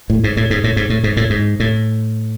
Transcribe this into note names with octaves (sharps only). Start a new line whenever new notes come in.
A2
G#2
A2
G#2
A2
G#2
A2
G#2
A2
G#2
A2